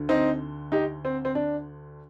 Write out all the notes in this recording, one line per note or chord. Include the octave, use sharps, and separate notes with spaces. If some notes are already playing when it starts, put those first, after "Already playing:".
Already playing: D2 D3
C4 D#4
D#4 G4
C4
C4
D4